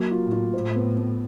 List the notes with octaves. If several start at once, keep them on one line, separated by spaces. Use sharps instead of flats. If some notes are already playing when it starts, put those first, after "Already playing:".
Already playing: F#3 A#3
F4
A2
F4
A2 C5
B3
B3